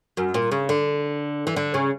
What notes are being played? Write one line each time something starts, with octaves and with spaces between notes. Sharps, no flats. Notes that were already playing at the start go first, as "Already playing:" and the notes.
F#2
A#2
C#3
D3
E3
D3
C#3